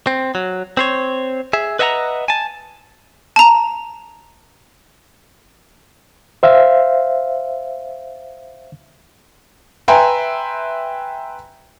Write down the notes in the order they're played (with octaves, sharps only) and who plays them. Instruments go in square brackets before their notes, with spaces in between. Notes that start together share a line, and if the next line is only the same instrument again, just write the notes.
[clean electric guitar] C4
F#3
C4 C5 C#5
G#4 E5
B4 D#5 E5 F#5 G#5 A#5
G#5 A5
[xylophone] A5 A#5
[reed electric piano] C5 E5 F5
[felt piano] B4 E5 G5 G#5 A#5 C6